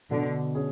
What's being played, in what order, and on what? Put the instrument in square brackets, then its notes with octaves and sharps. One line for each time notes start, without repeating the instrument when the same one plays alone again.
[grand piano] B2 [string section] D3
[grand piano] C#4 G#4